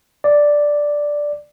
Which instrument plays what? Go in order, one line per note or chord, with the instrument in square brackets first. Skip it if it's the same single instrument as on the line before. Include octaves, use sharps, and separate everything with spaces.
[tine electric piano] D5